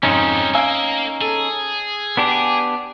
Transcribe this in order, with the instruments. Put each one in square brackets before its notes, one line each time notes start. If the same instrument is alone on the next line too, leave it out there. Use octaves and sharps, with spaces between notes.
[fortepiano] F2 G#2 [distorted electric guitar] G3 G#3 [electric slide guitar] C#4 D#4
[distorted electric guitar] A#3 [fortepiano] F5 G#5 E6
[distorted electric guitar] G#4 [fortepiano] A4
[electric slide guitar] B3 D4 G4